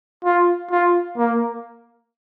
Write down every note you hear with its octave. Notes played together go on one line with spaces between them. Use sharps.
F4
F4
A#3